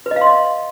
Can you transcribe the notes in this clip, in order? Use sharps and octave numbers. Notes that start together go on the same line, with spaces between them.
B4
D#5
F5
C6
D#5